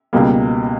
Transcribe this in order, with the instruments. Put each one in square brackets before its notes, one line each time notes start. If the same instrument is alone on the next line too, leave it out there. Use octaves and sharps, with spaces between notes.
[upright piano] C#2 B2 G3 A#3